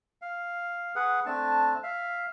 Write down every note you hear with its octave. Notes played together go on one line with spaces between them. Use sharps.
F5
G#4 B4 F#5
A3 C4 D4 A5
E5 F5